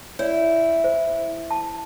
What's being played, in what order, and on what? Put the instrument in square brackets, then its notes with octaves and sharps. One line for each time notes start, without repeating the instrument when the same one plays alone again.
[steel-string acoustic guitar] E4 [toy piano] C#5 D5
[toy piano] C5
A5